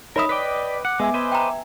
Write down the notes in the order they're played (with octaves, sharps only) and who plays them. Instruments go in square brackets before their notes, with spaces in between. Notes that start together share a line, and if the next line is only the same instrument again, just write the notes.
[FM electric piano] D#4 [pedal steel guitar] A#4 E5 [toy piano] C#5 B5 D#6
[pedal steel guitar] B4 D#5 G5 [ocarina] D5 [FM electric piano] D6 B6
[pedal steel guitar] F#5 [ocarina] D6
[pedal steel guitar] G#3 [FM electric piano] B3 E5 G#5
[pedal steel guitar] B4 C5 D#5
[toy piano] G5 A#5